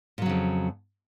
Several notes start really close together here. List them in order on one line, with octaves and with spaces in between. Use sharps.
A#2 F#3 C#3 F2